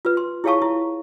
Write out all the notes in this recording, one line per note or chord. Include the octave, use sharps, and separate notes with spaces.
F4 B4
C6
E4 G#4 C#5 F5 A5 C#6
E4